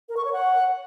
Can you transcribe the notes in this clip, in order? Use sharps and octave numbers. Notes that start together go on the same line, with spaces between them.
A#4
C#6
C#5
F#5